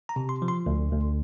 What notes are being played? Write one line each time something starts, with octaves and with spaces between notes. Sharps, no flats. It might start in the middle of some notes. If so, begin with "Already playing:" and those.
A#5
C3
C6
F3
C6
D2
D2